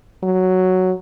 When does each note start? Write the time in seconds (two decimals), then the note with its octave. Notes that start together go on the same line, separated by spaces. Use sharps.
0.23 F#3